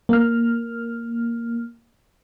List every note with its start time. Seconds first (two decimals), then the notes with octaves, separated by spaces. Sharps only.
0.09 A#3 F6